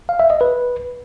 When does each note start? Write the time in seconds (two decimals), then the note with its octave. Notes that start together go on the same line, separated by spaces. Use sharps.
0.09 F5
0.20 E5
0.30 D#5
0.41 B4